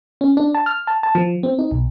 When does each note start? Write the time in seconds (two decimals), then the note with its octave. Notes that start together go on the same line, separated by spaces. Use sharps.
0.21 C#4
0.37 D4
0.55 A5
0.66 F6
0.87 A5
1.03 A5
1.15 F3
1.43 C4
1.59 D#4
1.71 B1